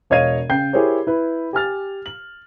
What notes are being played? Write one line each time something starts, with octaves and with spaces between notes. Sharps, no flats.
E1 C#5 D#5 F5 G#6 D#7
C#3 G5 G6 C7
E4 G4 G#4 A#4 C5 C#5
E4 B4
G4 G#5 F6 A6
F#7